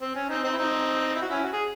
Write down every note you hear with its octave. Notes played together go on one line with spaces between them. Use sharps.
C4
C#4
C4 D#4
C4 D#4
E4
C4 D#4
E4
F#4
C#4 E4
F#4
G#4